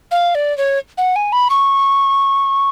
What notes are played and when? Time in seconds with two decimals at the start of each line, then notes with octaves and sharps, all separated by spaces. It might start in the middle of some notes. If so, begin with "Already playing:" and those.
0.11 F5
0.35 D5
0.57 C#5
0.98 F#5
1.16 G#5
1.32 B5
1.50 C#6